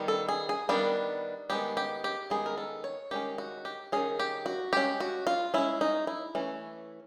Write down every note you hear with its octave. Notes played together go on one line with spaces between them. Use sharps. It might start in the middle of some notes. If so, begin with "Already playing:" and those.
Already playing: D#3 G3 B3
A4
G#4
G#4
D#3 G3 B3 D4
D#3 G#3 B3 G4
G4
G4
D#3 G#3 B3 G#4
A#4
A4
C#5
D#3 G#3 C#4 G4
F#4
G4
D#3 G#3 C#4 G#4
G4
F#4
G#3 C#4 G4
F#4
F4
G#3 C#4 E4
D#4
E4
E3 A3 C#4